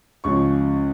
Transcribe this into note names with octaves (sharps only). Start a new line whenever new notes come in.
C#2 C#3 F3 C#6